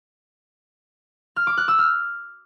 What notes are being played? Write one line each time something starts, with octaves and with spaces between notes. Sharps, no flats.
F6
D6
F#6
E6
F6